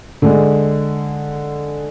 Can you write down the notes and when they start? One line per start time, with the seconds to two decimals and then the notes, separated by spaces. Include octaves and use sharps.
0.22 D3 G#3